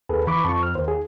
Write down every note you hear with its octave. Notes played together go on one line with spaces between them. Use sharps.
D#2 G#4 A4 B4
E3 B5 C#6 D6
F2 A5 C#6
F6
D#2 C5
G#4